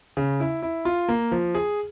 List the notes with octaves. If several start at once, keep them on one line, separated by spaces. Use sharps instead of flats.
C#3
E4
E4
F4
A#3
F3
G#4